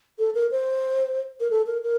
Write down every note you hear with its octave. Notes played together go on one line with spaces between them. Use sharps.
A4
A#4
C5
A#4
A4
A#4
A#4